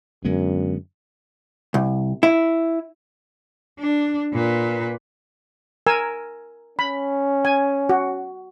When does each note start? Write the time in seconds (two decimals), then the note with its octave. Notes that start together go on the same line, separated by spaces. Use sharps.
0.25 F#2 D3 G#3 B3
1.74 C2
2.23 E4
3.79 D4
4.33 A#2 B4
5.87 A#4 G#5 E6
6.79 C#4 B5
7.45 G#5
7.89 F#4